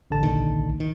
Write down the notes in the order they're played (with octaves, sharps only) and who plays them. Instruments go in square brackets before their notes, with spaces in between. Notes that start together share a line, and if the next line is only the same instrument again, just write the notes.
[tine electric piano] A1 D3 A5
[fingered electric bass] C2 A#2 D#3
D#3